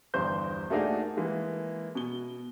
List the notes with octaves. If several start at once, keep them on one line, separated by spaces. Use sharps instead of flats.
G1 E2 G2 C5 G6
A3 A#3 D4 D#4 F#4 G#4
E3 G#3 A#3
B2 G7